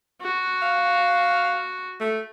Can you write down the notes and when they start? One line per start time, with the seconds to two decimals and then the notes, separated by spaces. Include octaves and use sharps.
0.21 F#4
0.62 F5
2.00 A3